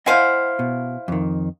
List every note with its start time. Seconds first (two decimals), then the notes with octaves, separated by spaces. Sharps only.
0.06 E4 C5 D#5 F5 F#5 G#5
0.59 B2
1.08 F2 D#3